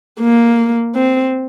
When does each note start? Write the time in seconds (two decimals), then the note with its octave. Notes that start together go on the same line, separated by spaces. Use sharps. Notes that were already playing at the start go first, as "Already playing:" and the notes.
0.20 A#3
0.96 C4